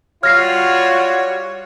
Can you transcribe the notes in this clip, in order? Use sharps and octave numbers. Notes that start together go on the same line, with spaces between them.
G3 F4 F#4 C#5 F6 A#6 C7